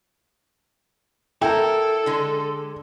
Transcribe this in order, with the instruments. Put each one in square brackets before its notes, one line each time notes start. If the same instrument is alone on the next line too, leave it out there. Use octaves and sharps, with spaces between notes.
[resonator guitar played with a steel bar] E4 A#4 [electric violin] A4 [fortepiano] G5
[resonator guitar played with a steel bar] D3 G#3